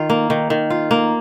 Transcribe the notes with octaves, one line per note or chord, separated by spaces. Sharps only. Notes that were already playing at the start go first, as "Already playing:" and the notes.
Already playing: D#3 F4
A#3
D#3
D#3
F4
A#3